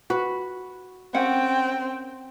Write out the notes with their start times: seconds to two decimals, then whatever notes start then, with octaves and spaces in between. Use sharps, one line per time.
0.10 F#4 B4
1.15 C4 C#4 A#4 F#5 G5